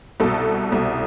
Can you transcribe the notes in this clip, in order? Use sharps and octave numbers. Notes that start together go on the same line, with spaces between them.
C2 B2 A4
C2 B2